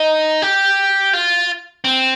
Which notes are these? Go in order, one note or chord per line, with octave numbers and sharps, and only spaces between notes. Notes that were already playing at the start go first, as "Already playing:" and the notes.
Already playing: D#4
G4
F4
C4